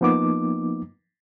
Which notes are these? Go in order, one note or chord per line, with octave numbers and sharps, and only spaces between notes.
F3 A#3 B3 D#4 D6